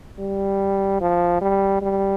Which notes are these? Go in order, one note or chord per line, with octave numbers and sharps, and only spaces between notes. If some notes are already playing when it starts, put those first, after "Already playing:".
G3
F3
G3
G3